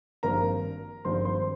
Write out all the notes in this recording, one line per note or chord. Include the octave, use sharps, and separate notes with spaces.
G#1 G2 F3 A#3 A#4 A#5
G#1 G2 F3 A#3 C5 C6
C5 C6